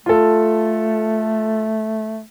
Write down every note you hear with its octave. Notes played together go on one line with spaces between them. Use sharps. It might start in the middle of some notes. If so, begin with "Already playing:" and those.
A3 F4 A4